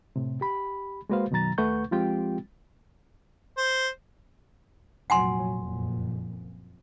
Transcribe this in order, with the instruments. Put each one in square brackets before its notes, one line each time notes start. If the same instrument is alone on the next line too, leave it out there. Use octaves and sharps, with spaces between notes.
[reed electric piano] A2 C3
G4 B5
G#3 A#3 F#4 B4 C5 F5
F#2 B2 D#3 F#3 A#5 A6
D#2 A3 B4 F#5 C#6 G6
F3 G#3 C4 F4 G4 G5
[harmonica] C5
[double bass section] F1 A#2 F#3 [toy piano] F#5 G#5 C6
[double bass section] F#1 F2 A#2